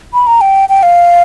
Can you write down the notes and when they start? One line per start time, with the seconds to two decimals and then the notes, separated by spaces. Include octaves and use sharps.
0.14 B5
0.27 A#5
0.41 G5
0.69 G5
0.83 F5